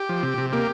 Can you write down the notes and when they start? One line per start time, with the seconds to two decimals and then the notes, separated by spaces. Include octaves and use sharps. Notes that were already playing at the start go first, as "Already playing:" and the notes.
Already playing: G4
0.09 F3
0.23 C3
0.38 C3
0.52 A#3 G4